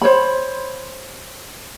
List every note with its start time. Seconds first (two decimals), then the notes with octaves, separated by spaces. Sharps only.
0.02 C5 C#5 B5